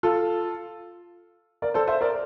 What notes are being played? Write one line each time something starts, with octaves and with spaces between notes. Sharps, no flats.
F4 A4
A#4 D5
A4 C5
C5 E5
A#4 D5